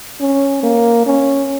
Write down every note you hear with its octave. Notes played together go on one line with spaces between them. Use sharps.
C#4
A#3
C#4